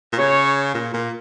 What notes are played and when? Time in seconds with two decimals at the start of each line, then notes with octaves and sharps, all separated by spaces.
0.12 A#2
0.19 C#3 C#5
0.74 A#2
0.94 A#2